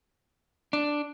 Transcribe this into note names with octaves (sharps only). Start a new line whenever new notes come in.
D4